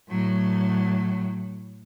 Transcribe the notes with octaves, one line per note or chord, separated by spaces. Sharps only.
A2 F#3